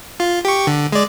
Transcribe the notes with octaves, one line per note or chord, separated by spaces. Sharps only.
F4
G4 C#6
D3
G#3 D5